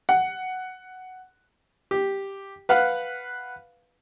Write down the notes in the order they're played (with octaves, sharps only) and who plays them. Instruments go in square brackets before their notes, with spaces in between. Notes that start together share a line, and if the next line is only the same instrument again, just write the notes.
[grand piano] F#5
[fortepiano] G4
B4 F5 F#5